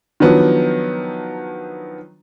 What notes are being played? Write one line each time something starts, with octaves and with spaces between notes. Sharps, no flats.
D#3 F3 F#3 B3 D4